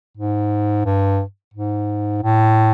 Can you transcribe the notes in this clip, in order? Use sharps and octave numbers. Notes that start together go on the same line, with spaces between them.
G#2
G2
G#2
A2